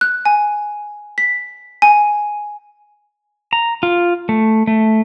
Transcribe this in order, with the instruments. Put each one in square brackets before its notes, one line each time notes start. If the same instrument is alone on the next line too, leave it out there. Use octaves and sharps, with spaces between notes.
[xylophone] F#6
G#5
B6
G#5
[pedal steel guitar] A#5
F4
A3
A3